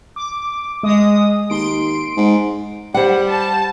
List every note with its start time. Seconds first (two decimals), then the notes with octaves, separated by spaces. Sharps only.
0.16 D6
0.83 G#3 D#6
1.50 D#2 C6 D7
2.17 G#2
2.94 G3 C5 F#5
3.28 A5